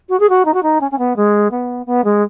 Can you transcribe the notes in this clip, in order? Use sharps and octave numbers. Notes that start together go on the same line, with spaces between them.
F#4
G#4
F#4
D#4
F#4
D#4
C#4
C#4
B3
G#3
B3
B3
G#3